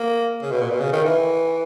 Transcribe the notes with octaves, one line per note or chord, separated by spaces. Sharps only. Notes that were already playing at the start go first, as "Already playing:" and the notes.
Already playing: A#3
C#3
B2
A#2
B2
C#3
D#3
E3